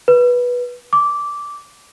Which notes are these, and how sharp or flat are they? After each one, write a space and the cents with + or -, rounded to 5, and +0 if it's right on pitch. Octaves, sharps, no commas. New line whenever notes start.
B4 -10
D6 -10